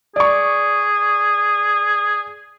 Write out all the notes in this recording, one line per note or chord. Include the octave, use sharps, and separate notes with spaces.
G#4 D5 C#6